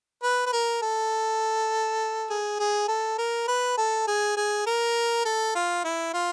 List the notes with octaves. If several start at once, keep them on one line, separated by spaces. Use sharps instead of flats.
B4
B4
A#4
A4
G#4
G#4
A4
A#4
B4
A4
G#4
G#4
A#4
A4
F4
E4
F4